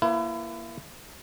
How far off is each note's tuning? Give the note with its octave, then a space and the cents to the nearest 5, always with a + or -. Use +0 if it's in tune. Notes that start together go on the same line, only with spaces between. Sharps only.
A#3 +10 E4 +30 B4 +25